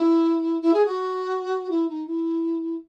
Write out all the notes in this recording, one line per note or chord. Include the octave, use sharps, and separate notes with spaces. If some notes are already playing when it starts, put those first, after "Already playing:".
Already playing: E4
E4
G#4
F#4
E4
D#4
E4